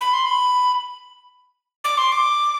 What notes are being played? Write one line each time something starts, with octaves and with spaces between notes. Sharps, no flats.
B5
C6
B5
D6
C6
D6